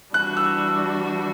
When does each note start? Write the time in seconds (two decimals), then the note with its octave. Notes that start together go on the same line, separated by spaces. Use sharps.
0.14 E3 G3 D4 F#4 F#6
0.37 E6